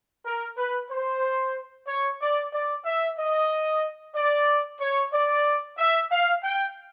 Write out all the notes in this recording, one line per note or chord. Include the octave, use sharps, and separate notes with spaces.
A#4
B4
C5
C#5
D5
D5
E5
D#5
D5
C#5
D5
E5
F5
G5